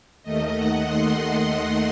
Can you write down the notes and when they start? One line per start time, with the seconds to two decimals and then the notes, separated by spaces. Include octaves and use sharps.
0.23 D#2 D#3 A3 D#5
0.55 F#5
0.87 C6
1.19 C6